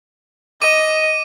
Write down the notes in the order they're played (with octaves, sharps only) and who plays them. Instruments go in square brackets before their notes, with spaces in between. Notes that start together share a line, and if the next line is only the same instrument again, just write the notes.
[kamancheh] D#5 [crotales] D6 D#7